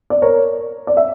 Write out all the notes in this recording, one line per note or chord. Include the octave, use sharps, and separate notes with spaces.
D5
A#4 C#5
D5
E5